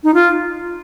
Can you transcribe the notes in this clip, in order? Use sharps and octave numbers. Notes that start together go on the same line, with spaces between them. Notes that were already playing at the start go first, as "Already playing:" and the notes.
D#4
F4